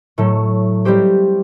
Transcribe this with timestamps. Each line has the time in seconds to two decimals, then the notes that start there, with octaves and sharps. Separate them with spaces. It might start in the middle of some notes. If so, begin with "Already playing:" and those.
0.18 A2 F#3 A3
0.85 G3 C4 G4 C5